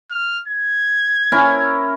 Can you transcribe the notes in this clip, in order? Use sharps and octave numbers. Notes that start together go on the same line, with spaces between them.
F6
G#6
C#4 E4 A#4